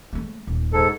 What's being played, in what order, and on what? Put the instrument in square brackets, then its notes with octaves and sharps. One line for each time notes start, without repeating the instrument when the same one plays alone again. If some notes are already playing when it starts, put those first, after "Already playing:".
[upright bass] G#3 A3
D#1
[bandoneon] G#2 A4